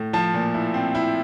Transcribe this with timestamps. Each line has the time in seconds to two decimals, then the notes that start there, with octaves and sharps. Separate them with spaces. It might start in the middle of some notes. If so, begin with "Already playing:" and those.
Already playing: A2
0.13 F3 A5
0.34 A#2
0.54 E4
0.74 C4
0.95 E4